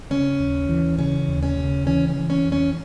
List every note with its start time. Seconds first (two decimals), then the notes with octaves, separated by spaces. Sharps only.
0.10 C#3 C#4
0.40 D#2
0.69 E3
0.98 C#3 C#4
1.28 D#2
1.43 C#4
1.57 C#3
1.86 E3 C#4
2.08 C#4
2.16 E3
2.30 C#4
2.45 F2
2.52 C#4